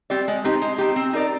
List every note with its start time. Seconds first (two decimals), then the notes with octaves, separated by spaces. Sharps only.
0.10 G3 C4 G4 D5
0.28 G#3
0.44 C4 D#4 G4
0.62 G#3
0.78 C4 D#4 G4
0.96 C4
1.13 D#4 A#4 D5